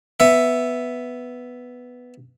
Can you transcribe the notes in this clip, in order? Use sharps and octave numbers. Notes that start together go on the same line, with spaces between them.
B3 E5